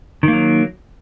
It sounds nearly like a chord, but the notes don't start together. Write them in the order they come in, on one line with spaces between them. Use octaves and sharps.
D#3 A#3 F#3